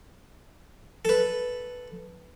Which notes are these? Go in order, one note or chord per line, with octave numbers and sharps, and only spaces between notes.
A4 B4